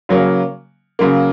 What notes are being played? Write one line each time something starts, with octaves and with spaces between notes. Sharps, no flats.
C#3 F#3 A#3
C#3 F#3 A#3